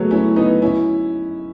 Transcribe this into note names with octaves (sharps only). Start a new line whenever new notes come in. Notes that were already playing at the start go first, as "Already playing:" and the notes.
Already playing: F#3 G#3 A3 B3
C#4 E4
B3 D#4
C#4 E4